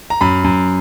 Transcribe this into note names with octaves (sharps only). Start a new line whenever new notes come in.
A#5
F#2 B5
F#2